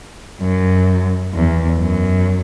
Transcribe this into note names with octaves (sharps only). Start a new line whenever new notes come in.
F#2
E2
F#2